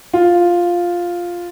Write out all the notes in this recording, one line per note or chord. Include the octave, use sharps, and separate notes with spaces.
F4